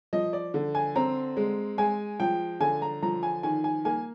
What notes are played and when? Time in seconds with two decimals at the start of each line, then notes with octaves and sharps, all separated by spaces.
0.13 F3 D#5
0.33 D5
0.54 D3
0.75 G#5
0.95 C4 A#5
1.37 G#3
1.78 G#3 G#5
2.20 F3 G5
2.60 D3 G#5
2.82 A#5
3.03 F3 A#5
3.23 G#5
3.43 D#3 G#5
3.64 G#5
3.85 A#3 G#5